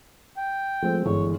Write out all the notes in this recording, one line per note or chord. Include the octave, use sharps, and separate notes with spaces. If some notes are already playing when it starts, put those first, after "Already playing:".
G5
F3 G#3 A3 C4
G1 E3 G#3 G#4 C#5